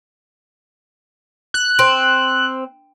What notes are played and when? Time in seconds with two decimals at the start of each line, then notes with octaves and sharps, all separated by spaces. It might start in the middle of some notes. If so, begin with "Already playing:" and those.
1.54 F#6
1.79 C4